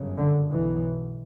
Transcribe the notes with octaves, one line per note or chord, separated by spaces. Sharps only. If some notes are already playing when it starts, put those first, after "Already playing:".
Already playing: G1 F#2 C#3
D3
B1 B2 E3